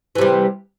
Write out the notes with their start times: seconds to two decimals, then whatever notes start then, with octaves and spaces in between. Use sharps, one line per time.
0.15 E3
0.18 C3
0.21 G3